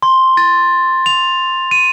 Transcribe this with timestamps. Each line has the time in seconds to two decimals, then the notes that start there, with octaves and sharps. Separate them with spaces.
0.03 C6
0.37 A6
1.06 F7
1.71 D#7